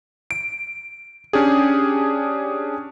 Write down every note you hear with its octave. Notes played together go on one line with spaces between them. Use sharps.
D7
C#4 D4 G4 G#4